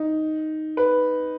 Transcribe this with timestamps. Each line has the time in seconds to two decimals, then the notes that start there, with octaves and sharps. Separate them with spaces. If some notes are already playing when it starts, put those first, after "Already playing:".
Already playing: D#4
0.77 B4